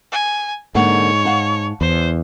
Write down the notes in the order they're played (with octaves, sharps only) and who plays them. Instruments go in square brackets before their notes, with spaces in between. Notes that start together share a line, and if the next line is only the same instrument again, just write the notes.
[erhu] G#5
[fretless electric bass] G#2 [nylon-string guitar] D3 A#3 F#5 [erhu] C#5
[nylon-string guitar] F5 F#5 A5
[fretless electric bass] E2 [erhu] C5